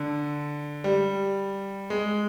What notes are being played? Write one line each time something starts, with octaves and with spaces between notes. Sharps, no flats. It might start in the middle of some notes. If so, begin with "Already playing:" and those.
Already playing: D3
G3
G#3